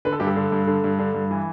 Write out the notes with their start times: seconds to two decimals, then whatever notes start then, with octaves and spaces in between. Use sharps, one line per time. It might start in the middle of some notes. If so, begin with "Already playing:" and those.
0.05 D3 B4
0.12 A4
0.20 G2 G4
0.26 A4
0.36 D3
0.52 G2
0.67 D3
0.84 G2
0.99 D3
1.14 G2
1.31 E3